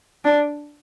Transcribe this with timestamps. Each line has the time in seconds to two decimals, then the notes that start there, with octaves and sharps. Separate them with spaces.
0.25 D4